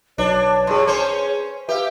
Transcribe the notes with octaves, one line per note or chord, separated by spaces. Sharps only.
B1 F#3 D4 B4 C#5
G2 G#4 B4 C6
C#4 C5
G4 B4 E5 F5